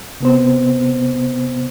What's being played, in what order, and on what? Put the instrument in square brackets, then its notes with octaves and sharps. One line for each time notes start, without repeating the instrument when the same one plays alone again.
[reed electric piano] C3 B3 C5